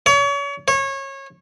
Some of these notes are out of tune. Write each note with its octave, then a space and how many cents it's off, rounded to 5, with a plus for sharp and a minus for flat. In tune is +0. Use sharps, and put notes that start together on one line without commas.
C#5 +35
C#5 -25